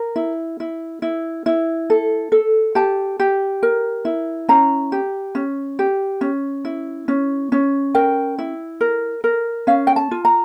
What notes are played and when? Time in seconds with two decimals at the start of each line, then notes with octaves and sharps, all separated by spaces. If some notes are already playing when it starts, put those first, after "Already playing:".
Already playing: A#4
0.16 E4
0.60 E4
1.02 E4
1.46 E4
1.90 A4
2.32 A4
2.75 G4 A5
3.20 G4
3.63 A#4
4.05 E4
4.49 C#4 A#5
4.92 G4
5.35 C#4
5.79 G4
6.21 C#4
6.65 E4
7.08 C#4
7.52 C#4
7.95 A#4 G5
8.38 E4
8.81 A#4
9.24 A#4
9.67 C#4 F5
9.87 G5
9.96 A5
10.11 F4
10.25 A#5